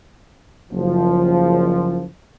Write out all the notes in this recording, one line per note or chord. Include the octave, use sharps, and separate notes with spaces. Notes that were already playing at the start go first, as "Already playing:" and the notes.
F#1 F3